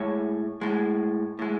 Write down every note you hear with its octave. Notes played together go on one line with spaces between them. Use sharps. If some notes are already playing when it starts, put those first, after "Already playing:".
Already playing: A2 G#3 C#5
A2 G#3
A2 G#3